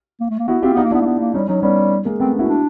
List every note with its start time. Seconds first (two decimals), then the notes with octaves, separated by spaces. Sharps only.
0.20 A#3
0.30 A3
0.39 A#3
0.48 B3 E4 F#4
0.62 C4 F4 G4
0.74 B3 D#4 F4
0.83 A#3
0.91 B3 D4 E4
1.01 A#3
1.06 B3
1.20 A#3
1.34 G3 C#4 D#4
1.48 F#3 C#4 D#4
1.62 G3 B3 C#4
2.05 G#3 A#3
2.20 A3 B3 C4
2.35 C#4 E4 F#4
2.48 D4